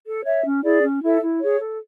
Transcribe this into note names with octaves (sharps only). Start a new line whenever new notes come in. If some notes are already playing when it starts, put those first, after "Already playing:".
A4
C#5 E5
C#4
E4 G#4 D5
C#4
E4 A4 E5
E4
G#4 C#5
A4